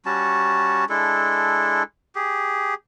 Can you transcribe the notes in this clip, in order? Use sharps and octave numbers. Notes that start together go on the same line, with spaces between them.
G3 C#4 F#4 A5
G#3 D4 E4 A4
G4 G#4